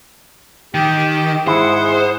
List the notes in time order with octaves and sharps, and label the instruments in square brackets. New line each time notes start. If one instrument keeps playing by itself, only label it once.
[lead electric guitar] D#3 [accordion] G4 G5
[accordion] G#2 G#4 F#5 [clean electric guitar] E4 [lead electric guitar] C5